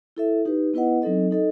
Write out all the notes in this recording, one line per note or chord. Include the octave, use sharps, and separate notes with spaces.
E4 A4 E5
D#4 G4 B4
B3 E4 B4 D#5 F#5
F#3 C4 D#4 A4 D#5
D#4 A4 D#5